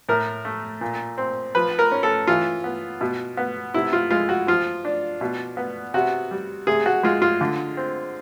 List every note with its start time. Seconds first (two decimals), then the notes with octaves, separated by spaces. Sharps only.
0.09 A2 A#4
0.45 A3
0.81 A#2
1.18 C4
1.55 F3 B4
1.79 A#4
1.92 C#4
2.03 A4
2.27 E3 F4
2.64 B3
3.01 B2
3.37 B3
3.74 C3 E4
3.93 F4
4.11 G#3 F4
4.29 F#4
4.47 F3 F4
4.85 D4
5.21 B2
5.57 B3
5.94 C3 F#4
6.31 G3
6.67 C3 G#4
6.86 F#4
7.03 G#3 F4
7.22 F4
7.41 D3
7.77 C4